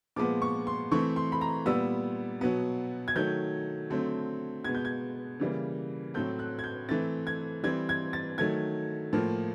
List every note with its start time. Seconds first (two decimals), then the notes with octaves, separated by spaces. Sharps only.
0.16 A#2 F3 G#3 B3 D6
0.42 C#6
0.67 C6
0.91 E3 A3 C4 C#6
1.16 C6
1.32 B5
1.41 A#5
1.66 A#2 G3 B3 E6
2.41 B2 F#3 B3
3.08 G#6
3.16 D#3 F#3 A3 G6
3.90 D3 F#3 A3 C4
4.64 B2 G#3 B3 G#6
4.75 G6
4.85 G#6
5.40 C#3 E3 G3 A#3
6.14 A2 F#3 A3 C4 G6
6.39 F#6
6.59 G#6
6.64 G6
6.88 E3 A3 C4 A6
7.27 G#6
7.63 E3 G3 C4 G#6
7.89 G#6
8.13 A6
8.38 D#3 F#3 A3 G#6
9.13 A2 F3 A#3